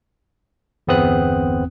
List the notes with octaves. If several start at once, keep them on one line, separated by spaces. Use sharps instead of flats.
G1 E2 B3 C4 D#6 F#6